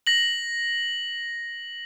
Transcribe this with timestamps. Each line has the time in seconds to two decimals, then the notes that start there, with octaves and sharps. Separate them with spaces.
0.07 A#6 F#7